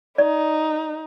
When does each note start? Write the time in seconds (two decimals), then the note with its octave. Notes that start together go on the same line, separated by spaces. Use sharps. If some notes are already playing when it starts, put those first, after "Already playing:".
0.18 D#4 D5